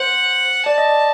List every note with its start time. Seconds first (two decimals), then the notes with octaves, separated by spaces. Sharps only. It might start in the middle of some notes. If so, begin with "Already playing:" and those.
Already playing: C5 F#5
0.66 D5 A5
0.78 D#5
0.89 D5